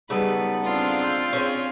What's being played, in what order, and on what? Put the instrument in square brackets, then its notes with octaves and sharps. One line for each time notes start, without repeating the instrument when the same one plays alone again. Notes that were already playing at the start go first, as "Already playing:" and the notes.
[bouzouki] C#3 [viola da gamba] G3 [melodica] B3 D#4 A4 [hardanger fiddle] B4
[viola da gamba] C4 D4 [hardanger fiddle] F4
[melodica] G5 C6 E6
[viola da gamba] C4 [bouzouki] C#4 G#4 C5